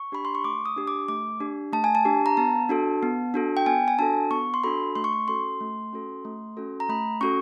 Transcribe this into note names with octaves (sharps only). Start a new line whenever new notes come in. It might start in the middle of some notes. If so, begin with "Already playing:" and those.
Already playing: C#6
D4 G4 B5
C6
C#6
A3 D6
D#6
D4 G4
D6
A3 D6
D4 G4
A3 A5
G#5
A5
D4 G4
A#5
B3 A5
D4 F#4 A4
B3
D4 F#4 A4
G5
B3 G#5
G#5
D4 F#4 A4 A5
B3 C#6
C6
D4 F#4 A4 B5
A3 C6
C#6
C6
C#4 F#4 A4 C6
A3
C#4 F#4 A4
A3
C#4 F#4 A4
A#5
A3 B5
C#4 F#4 A4 C#6